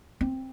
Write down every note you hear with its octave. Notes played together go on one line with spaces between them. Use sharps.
C4